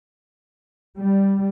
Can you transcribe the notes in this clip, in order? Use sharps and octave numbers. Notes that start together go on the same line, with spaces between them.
G3